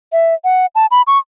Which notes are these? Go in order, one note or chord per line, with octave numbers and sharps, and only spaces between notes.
E5
F#5
A5
B5
C#6